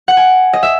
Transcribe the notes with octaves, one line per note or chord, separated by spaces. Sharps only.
F#5
G#5
D#5
E5